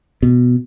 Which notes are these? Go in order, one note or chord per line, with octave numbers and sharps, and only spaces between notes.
B2